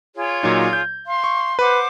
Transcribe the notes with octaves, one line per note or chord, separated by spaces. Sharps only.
F4 G#4 C#5
A#2 F#3 D#4
G6
F5 C6
C#6
B4 C5 F#5 D6